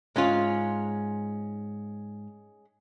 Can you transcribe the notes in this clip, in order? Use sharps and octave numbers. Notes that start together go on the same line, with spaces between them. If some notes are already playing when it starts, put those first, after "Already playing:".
G#2 G#3 C#4 F4